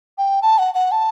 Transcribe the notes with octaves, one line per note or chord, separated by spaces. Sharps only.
G5
A5
F#5
F#5
A5